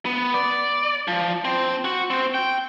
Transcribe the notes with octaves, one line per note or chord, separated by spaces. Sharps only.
B3
D5
F3
C4
F#4
C4
G5